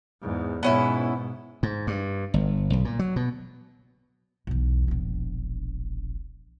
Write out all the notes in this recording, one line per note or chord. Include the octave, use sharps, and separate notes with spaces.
E2 G#2
G#2 B2 B3 C#4 E4
G#2
G2
G1
B1
A#2
F#3
B2
B1 E2
E1 A#1